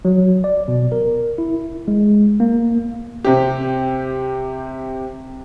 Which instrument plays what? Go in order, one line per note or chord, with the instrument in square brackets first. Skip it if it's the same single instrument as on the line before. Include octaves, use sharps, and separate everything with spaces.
[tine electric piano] F#3
D5
B2
A#4
E4
G#3
A#3
[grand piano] C3 G4